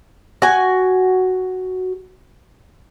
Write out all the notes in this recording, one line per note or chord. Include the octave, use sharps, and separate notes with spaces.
F#4 G#5